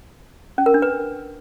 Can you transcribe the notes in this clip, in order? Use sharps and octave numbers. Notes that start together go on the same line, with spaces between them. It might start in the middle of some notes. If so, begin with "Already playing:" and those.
C#4
A#4
D4
B4